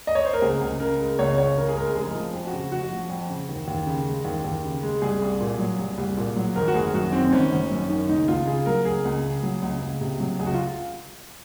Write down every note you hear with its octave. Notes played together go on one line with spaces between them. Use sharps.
D#5
C#5
C5
A#4
C#2 G#4
C#2
C#3 A#4
G#3
C#2 C#5
C#2 C#5
C#3 A#4
G#4
G#3 A#4
F1 G#4
F3
F2
F#4
C#3
F1 F#4
F3
F2
C#3
D#2
D#2
C#3
G#3
D#2
D#2
C#3
G#3
C2 G#4
C2
A#2
F#3
C2
C2
A#2
F#3
G#1 A#4
F#4
G#1 G#4
F#2 F#4
D#3 C4
G#1 C#4
G#1
F#2
D#3
C#2 D#4
C#2 F4
C#3 G#4
F#3 A#4
C#2 G#4
C#2
C#3
F#3
C#2
C#2
C3
F#3
C#2 G#4
F#4
F4